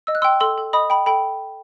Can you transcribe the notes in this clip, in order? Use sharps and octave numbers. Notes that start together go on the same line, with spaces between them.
D#5 E6
F#6
G5 C6 E6
A4 C6 E6
A4
D#5 B5 D#6
G5 B5
A4 G5 B5